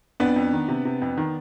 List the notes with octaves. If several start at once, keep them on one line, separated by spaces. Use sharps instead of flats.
F2 B3 D4
F2
D#3
C3
C3
F2
D#3